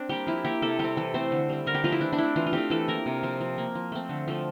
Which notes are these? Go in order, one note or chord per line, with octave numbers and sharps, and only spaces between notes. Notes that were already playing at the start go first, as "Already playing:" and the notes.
Already playing: C4 D4
G3 A#3 G4
F3 E4
A#3 G4
C3 A4
G3 C4 G4
E3 A4
A3 C4 C5
D3
G3 C4
D3 A#4
G4
F3 A3 F4
E4
E3 D4
D4
A3 C4 E4
E3 F4
F4
A3 C4 G4
E3 A4
A#3 A#4
C3
F3 C4
F3
A#3
F3
A3 C4
D3
F3 A3